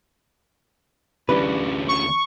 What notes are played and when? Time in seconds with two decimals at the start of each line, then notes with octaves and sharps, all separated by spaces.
1.29 D2 E3 G3 C#4 D4 B4
1.88 C#6